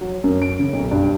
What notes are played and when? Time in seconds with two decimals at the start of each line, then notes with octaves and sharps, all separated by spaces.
0.01 F#3
0.24 F#2
0.42 D7
0.59 C#3
0.73 B1
0.91 G2